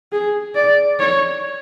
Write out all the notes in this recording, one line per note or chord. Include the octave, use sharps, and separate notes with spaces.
G#4
D5
C#5